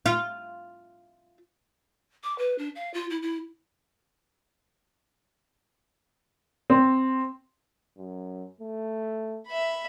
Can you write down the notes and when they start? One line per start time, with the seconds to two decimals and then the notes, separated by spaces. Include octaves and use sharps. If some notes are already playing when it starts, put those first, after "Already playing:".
0.06 F4
2.24 D6
2.38 B4
2.58 D4
2.76 F5
2.94 F4
3.10 E4
3.22 E4
6.70 C4
7.97 F#2
8.61 A3
9.47 E5 B5